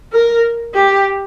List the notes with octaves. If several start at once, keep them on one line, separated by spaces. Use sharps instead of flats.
A#4
G4